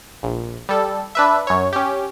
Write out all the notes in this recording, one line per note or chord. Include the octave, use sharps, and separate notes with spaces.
A#1
G3 A4
D4 B4 E5
F#2 C#5
C#4 G4